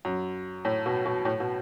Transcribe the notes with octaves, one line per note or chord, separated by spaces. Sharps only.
F#2
A2
B2
B2
A2
B2